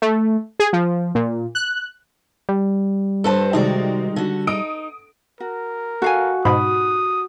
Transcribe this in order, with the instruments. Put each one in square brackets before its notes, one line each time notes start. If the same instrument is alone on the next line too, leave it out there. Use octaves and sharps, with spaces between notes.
[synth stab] A3
G#4
F3
A#2
F#6
[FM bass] G3
[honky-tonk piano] G2 A5 [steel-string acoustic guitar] A4 B4 C5
[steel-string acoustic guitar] C3 F#4 D5 [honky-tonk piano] D#3 G#3 D#4
[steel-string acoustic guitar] D3 F#4
[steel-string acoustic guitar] D#4 [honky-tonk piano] D#6 D7
[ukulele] F#4 [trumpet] A#4
[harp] F#4 [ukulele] A4 F5 G#5
[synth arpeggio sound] G#2 B2 [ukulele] B5 [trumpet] D#6